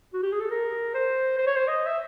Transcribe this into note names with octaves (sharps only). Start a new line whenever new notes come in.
F#4
G4
G#4
A4
A#4
C5
C5
C#5
C5
D#5
E5